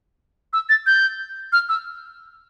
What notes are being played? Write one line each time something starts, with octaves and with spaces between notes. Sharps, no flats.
E6
A6
G6
F6
E6